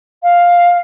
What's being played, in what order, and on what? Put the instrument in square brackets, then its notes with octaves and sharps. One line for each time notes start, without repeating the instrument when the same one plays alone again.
[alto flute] F5